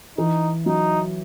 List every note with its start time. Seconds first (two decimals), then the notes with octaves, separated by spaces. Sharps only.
0.18 E3 D#4
0.66 F#3 D#4